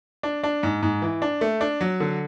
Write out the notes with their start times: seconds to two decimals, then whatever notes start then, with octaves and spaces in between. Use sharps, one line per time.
0.23 D4
0.43 D4
0.63 G#2
0.83 G#2
1.02 E3
1.22 D4
1.41 A3
1.61 D4
1.81 F#3
2.00 D3